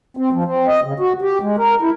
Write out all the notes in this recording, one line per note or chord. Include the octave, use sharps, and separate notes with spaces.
C4
F3
C4
D#5
C#3
F#4
G4
G#3
A#4
E4